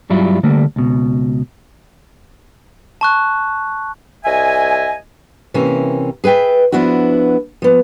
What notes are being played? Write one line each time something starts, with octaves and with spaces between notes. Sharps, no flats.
G2 F#3 G3 E4 F4
D3 G3 A3 A#3
C#2 B2
A5 C#6 F#6
C2 D#5 E5 G#5
C3 E3 A#3 C#4
G#4 B4 E5 G5
F3 B3 D4 E4 F#4
F3 B3